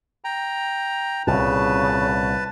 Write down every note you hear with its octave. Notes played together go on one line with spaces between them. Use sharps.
G5 A#5
C2 A#2 C#3 B4 A5